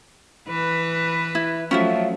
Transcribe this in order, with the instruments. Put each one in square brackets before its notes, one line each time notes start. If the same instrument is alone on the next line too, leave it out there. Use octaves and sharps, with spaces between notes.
[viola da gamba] E3 B4
[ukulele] E4
[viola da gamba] F3 F#3 A3 [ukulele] C#4 F4 E5